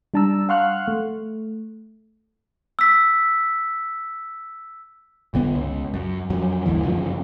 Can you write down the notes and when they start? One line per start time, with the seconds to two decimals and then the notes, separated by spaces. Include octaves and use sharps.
0.14 G3 D4 A5 A#5 E6
0.49 F5 F#5 C6 C#6 F6 F#6
0.88 A3
2.79 E6 B6
5.34 G1 D3 B3
5.54 C#2
5.94 F#2
6.30 F2 F#3
6.66 F#1 D2 G2 E3
6.84 F#2 C#3 F3